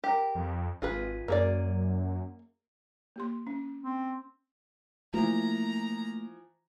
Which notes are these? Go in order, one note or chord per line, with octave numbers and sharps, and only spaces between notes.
G4 A#4
F2
G#1 F4 G#4 B4
F#2 A#3 G#4 D5
A#3 G4 C6
C#4
C4
E3 F3 A3 A#3 A#5